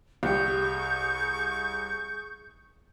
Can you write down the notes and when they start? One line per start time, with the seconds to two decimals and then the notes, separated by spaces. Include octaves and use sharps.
0.23 C2 G4 G#4 C#6 G6